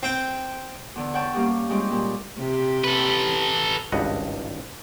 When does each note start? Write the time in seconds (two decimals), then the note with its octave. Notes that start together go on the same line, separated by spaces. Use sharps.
0.03 C4 G5
0.96 E2 D3
1.14 C#5 F#5 G5 A5
1.34 G2 G3 A#3 C#4 G4 F5
1.69 G3 G#3 C4 C#4 F4 G4
1.91 A#2 G3 G#3
2.39 C3 G4
2.84 A4 B4
3.92 G#1 C#2 G2 D#5 F#5